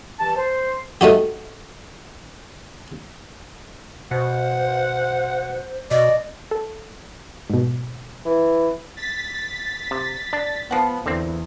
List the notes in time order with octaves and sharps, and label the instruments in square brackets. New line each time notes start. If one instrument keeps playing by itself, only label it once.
[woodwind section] G2 E3 A5
C5
[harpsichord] A3 D#4 F#4 G4
[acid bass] B2 [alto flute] C5 [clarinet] F#5
[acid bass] B2 [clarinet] D5 [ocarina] D#5
[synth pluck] A4
G#2 B2
[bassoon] E3
[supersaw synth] A6 B6
[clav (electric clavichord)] C3
D4
[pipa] F3 F#5 [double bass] B3
[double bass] E2 [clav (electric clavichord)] D3 C4